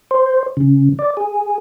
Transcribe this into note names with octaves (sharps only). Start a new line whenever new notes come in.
C5
C#3
D5
G#4